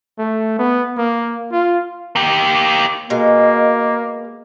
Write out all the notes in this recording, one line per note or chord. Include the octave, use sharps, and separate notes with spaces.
A3
B3
A#3
F4
A#3 G4
B2 G#3 A#3